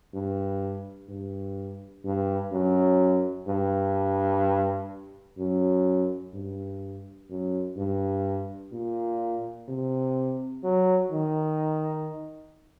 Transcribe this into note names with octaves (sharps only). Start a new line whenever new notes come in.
G2
G2
G2
F#2
G2
F#2
G2
F#2
G2
A#2
C3
F#3
D#3